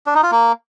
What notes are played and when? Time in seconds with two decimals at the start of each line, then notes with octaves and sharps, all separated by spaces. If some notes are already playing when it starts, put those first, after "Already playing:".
0.06 D4
0.15 D#4
0.23 F4
0.31 A#3